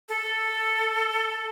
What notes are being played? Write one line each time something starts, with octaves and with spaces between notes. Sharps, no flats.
A4